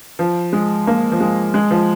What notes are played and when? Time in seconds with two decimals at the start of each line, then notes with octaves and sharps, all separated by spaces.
0.19 F3
0.53 G#3
0.87 A#3
1.12 F3
1.20 G#3
1.54 G#3
1.71 F3